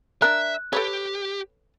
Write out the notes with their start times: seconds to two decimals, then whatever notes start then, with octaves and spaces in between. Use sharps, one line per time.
0.22 D4 A#4 E5 F#6
0.73 G4 A4 B4 C#5